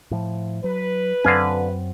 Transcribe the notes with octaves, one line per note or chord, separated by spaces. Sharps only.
A2 F3
F#3 B4
F#2 D3 F#3 C4 F5 G#5